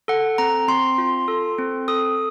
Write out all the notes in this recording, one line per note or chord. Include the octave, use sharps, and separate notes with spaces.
A4 F#5
C4 A#5
C4 C6
F4
A4
C4
A4 D#6